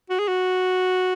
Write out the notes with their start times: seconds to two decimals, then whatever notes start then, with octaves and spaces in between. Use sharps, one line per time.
0.10 F#4
0.19 G#4
0.28 F#4